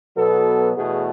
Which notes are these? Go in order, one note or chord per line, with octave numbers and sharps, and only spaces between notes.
B2 F#3 B3 A4
E2 B2 A3 G#4